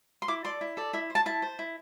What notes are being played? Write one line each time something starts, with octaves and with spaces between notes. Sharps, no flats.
C6
E4 D6
A4 D5 C6
E4
A4 D5
E4 E5
C5
A5
E4 A5
C5
E4